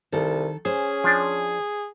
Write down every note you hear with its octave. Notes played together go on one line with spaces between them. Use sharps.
C2 D#3 A4
C#4 G#4 C5
F3 D4